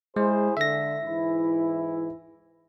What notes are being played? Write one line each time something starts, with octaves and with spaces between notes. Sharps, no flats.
G#3 E4 G#4 C5
D3 E5 A#6
G#2 E3 E4